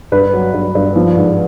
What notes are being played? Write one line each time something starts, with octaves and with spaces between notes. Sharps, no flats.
G2 B4
F#3
G2
G2
F3
G#2